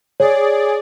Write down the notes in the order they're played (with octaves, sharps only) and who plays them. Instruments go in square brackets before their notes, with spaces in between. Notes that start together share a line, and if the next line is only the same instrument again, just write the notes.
[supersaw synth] G#4 D5 [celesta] C#5